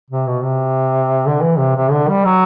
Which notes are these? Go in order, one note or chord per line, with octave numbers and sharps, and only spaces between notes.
C3
B2
C3
D3
E3
C3
C3
D3
G3
F#3